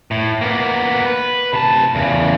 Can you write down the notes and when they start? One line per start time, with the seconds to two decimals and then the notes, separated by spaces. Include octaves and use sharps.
0.11 A2
0.41 A#3 B3
1.06 B4
1.53 C3 A5
1.95 E2 C#3